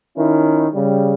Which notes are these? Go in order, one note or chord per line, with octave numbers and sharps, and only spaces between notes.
D#3 C#4 E4
C#3 G3